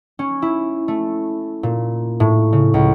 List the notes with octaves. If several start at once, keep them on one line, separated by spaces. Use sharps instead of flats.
C#4
E4
A3
A#2
A2
C#3
C#2